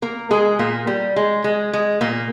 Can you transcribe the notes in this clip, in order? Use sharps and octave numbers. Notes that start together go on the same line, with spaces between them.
A#3 A#4
G#3 G#4
A#2 A#3
G3
G#3
G#3
G#3
A#2 A#3